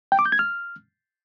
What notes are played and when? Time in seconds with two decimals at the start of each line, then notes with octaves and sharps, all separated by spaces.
0.12 G5
0.19 D6
0.26 G6
0.32 G#6
0.39 F6